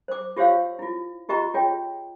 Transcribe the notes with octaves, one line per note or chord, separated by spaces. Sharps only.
C5 D6
F4 G4 C5 C#5 F5 E6
E4 F4
F4 G4 D#5 A#5 C#6
F4 G#4 C#5 G5